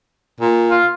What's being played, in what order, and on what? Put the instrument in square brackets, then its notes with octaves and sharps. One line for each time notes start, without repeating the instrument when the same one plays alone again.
[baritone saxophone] A#2
[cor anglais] F4